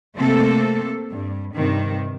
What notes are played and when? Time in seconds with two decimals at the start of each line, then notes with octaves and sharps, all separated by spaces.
0.15 C3 A3 A#3 C4 A4
1.11 G2
1.55 G2 C3 D#3